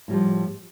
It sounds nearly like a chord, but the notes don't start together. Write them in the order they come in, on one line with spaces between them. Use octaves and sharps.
A2 G3 F3